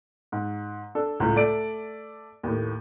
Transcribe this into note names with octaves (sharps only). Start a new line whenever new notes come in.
G#2
D4 A4
C#2 A2
A3 D5 D7
D#2 A2